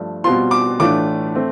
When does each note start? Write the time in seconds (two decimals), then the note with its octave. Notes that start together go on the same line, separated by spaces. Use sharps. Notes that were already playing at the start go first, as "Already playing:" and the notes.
Already playing: G2 F3 A3
0.24 B2 G3 C4 F4 C6
0.51 D6
0.79 A2 E3 A3 D4 F4 D6
1.35 A3 C4